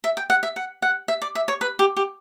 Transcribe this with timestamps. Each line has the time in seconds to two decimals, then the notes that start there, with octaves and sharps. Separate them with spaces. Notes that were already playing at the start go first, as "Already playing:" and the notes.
0.04 E5
0.17 G5
0.30 F#5
0.43 E5
0.56 F#5
0.82 F#5
1.08 E5
1.22 D5
1.35 E5
1.48 C#5
1.61 B4
1.79 G4
1.97 G4